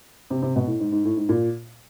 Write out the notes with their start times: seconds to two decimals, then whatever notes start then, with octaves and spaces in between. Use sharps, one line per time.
0.30 C3
0.43 C3
0.56 B2
0.67 A2
0.80 G#2
0.92 G#2
1.05 A2
1.17 G#2
1.29 A#2